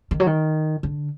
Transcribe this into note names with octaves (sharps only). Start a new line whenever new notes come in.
D#3
F#3
D#3
D3